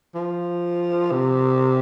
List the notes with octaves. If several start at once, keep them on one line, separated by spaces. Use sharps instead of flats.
F3
C3